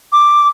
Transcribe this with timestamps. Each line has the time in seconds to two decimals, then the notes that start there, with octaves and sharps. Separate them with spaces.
0.12 D6